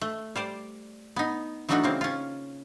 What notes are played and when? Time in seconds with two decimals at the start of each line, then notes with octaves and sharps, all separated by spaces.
0.01 A3
0.36 G3 C5 D5
1.16 B3 D#4
1.69 E3 F#3 A3 D4 D#4 F#4
1.84 C#3 A#3 C4
2.01 C#4 F4